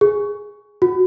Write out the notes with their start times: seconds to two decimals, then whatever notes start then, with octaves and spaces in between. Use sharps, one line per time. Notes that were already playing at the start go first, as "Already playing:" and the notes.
0.01 G#4
0.82 F#4